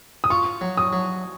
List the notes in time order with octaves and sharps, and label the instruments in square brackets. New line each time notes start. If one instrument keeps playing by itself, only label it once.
[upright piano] D#6
[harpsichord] F4 [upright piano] C#6
[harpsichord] F#3
[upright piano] D#6
[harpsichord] F#3